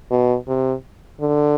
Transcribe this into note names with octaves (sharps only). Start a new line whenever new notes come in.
B2
C3
D3